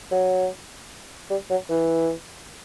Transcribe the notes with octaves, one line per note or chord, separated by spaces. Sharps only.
F#3
G3
F#3
E3